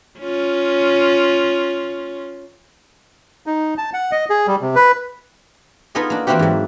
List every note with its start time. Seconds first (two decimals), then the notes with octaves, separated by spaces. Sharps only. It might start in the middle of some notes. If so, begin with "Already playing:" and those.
0.20 C#4 F4
3.46 D#4
3.78 A5
3.94 F#5
4.12 D#5
4.30 G#4
4.47 G3
4.61 C3
4.75 B4
5.95 B3 D#4 F4 A4 D#5 G#5
6.10 A#3 D4
6.27 E3 A#3 C4 E4 F#4 G4
6.39 G#2 F#3